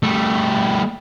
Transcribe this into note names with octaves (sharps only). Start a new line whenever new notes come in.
G3 A3